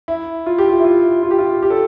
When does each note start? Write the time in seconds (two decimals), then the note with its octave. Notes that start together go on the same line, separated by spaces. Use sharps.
0.08 E4
0.46 F4
0.58 G4
0.69 F4
0.80 E4
0.85 F4
1.23 F4
1.31 G4
1.39 F4
1.63 G4
1.70 A4